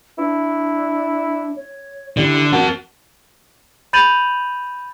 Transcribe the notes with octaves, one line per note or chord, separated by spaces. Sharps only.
D4 E4
C#5
D3 G3 E4
C4 F#4 A#4 A5
B5 G6 A6 D#7 F7 F#7